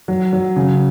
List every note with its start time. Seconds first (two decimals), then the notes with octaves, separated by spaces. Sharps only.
0.08 F#3
0.33 F#3
0.56 C#3